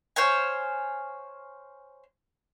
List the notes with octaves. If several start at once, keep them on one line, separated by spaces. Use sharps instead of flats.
C5 C#5 F5 G#5